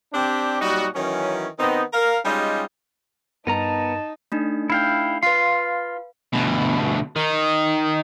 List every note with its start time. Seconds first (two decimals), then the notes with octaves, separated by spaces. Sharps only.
0.13 C4 D4 G4
0.62 A#2 F#3 G3 D#4 F#4
0.96 D#3 E3 F#3 C#4
1.59 D#3 B3 C4 D#4
1.94 A#4 F5
2.25 G3 G#3 C#4 D#4 F4 G4
3.47 G2 B3 D#4 A#4 A5 A#5
4.32 A3 D4 D#4
4.70 E4 F5 G5
5.23 F4 B4 F5 C6
6.33 D2 B2
7.16 D#3 D#4